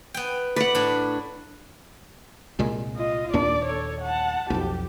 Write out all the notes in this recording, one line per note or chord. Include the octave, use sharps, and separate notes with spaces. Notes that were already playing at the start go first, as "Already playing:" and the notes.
B3 G5
B4 D5 F#5
A2 D4
C2 A#2 G#3
F4 D#5
D#2 A#2 D4 D5
A4 C#5
F#5 A5
B1 F2 G4